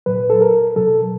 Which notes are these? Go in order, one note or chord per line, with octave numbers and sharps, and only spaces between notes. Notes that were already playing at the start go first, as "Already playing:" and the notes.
A#2 F#3 B4
A4
A#4
B2 F#3 A4